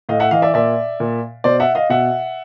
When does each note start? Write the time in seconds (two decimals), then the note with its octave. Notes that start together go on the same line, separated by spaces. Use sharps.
0.09 A2 D#5 F5
0.20 E5 F#5
0.31 E3 D#5 F5
0.42 D5 E5
0.54 A#2 D5 E5
1.00 A#2
1.44 B2 C5 D5
1.60 E5 F#5
1.75 D#5 F5
1.90 B2 E5 F#5